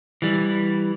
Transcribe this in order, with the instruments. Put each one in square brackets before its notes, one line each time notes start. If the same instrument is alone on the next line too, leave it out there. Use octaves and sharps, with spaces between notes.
[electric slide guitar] E3 G3